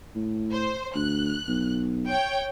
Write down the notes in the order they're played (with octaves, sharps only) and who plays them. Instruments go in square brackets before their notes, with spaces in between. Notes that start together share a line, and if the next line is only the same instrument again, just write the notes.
[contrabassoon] A2
[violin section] C5
[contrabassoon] D2 [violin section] F#6
[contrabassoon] B1
[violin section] C#5 G5